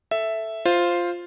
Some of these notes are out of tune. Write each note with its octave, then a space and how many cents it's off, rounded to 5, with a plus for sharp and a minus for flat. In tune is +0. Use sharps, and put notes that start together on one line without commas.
A4 +0 E5 +0
F4 +0 C5 +0